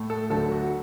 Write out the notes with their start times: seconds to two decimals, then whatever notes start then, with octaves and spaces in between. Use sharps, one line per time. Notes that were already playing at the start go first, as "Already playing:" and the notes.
Already playing: A2 A3
0.10 A4
0.30 D2 D3 F#3 A3 A4
0.51 F#4